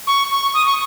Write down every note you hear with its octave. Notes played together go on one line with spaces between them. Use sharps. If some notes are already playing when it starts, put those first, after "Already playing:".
C#6
C#6
D#6
C#6